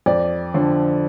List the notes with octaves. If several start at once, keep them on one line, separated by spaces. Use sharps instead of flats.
F2 D5
D3 F3